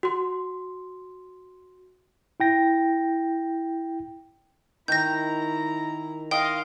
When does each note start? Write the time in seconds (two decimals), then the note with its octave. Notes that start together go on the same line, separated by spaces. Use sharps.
0.03 F#4 C6
2.40 E4 G5 A#6
4.88 D#3 E4 A#5 G6 A#6
6.31 D#5 F5 G5 C6